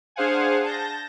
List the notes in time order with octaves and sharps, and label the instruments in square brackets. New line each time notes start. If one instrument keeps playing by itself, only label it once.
[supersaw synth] D4 G#4 C5 F5 F#5 G#5
A5 G6 A#6